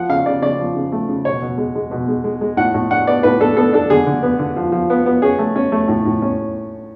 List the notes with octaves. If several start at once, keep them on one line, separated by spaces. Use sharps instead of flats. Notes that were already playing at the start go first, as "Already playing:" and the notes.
Already playing: F3 F#5
C#3 F5
C#3 D5
C#3 D5
F3
C#3
A3
C#3
B2 C#5
B2
G#3
G#3
B2
G#3
G#3
G#3
A2 F#5
A2
D4 F#5
B3 D5
A2 B4
D4 A4
B3 A4
D4 A4
D3 G#4
D3
B3
D3
F3
F3
B3
B3
C#4 G#4
A3
C#4
A3
A2
A2
C#4